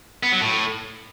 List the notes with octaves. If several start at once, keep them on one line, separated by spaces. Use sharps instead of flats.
B3
F#3
A2